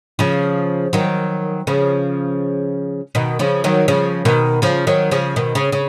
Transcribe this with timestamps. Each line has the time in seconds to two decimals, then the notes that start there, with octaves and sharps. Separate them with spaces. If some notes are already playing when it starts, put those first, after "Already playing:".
0.19 C#3 F3
0.93 D#3 F#3
1.67 C#3 F3
3.15 B2 D#3
3.39 C#3 F3
3.64 D#3 F#3
3.88 C#3 F3
4.25 B2 D#3
4.62 C#3 F3
4.87 D#3 F#3
5.11 C#3 F3
5.36 B2 D#3
5.55 C#3
5.72 C#3